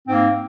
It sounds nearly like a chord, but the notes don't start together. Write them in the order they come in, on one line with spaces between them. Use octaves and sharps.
C4 G#2 A#3